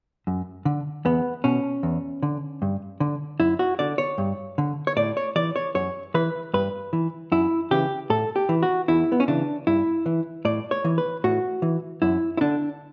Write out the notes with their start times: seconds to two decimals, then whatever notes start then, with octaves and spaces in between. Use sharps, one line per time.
0.27 F#2
0.65 D3
1.05 E2 B3
1.44 B2 C#4
1.83 E2
2.23 D3
2.62 G2
3.00 D3
3.40 F#2 E4
3.59 F#4
3.79 D3 D5
3.98 C#5
4.18 G2
4.58 D3
4.87 C#5
4.97 A2 D5
5.17 C#5
5.36 E3 D5
5.56 C#5
5.75 F#2 C#5
6.14 E3 B4
6.54 G2 B4
6.93 E3
7.32 F#2 E4
7.71 C#3 E3 G4
8.10 A2 A4
8.36 G4
8.49 E3
8.63 F#4
8.88 E2 E4
9.12 B3
9.20 C#4
9.28 C#3 E3 D4
9.67 G2 E4
10.06 E3
10.45 A2 D5
10.71 C#5
10.84 E3
10.98 B4
11.24 A2 F#4
11.62 E3
12.02 F#2 E4
12.37 E4
12.41 D3 D4